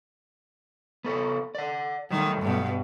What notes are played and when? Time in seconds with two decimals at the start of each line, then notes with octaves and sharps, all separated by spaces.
1.05 B3 A4 C#5
1.55 D5 F#5
2.11 D#3 F#3 G3 A3
2.41 G2 B2